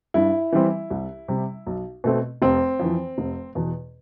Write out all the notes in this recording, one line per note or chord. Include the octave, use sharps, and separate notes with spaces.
G2 E4
E3 G3 C4
C2
C3 G3
B1
B2 A3 C4
F1 C4
F2 E3
F1
E2 B2